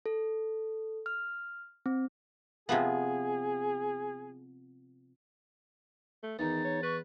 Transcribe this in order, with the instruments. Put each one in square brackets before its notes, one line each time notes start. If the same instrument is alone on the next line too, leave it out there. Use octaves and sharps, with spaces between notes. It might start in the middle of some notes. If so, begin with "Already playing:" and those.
[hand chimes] A4
F6
C4
[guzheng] C3 F3 B3 [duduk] G#4
[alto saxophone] A3
[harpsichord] E2 [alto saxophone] D#3 [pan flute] D#4 [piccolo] A6
[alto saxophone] C#5
[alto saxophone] B4 [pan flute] C#6